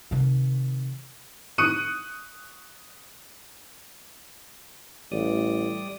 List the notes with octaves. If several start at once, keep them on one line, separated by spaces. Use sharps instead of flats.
C3 D#3
C#6 D#6 F#6 C#7 D#7
A1 G3 D5 D#6